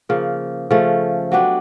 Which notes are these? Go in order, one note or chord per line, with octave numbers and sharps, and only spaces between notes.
C#3 F3 A#3
C#3 F3 A3 C#4
F#3 B3 D4 G4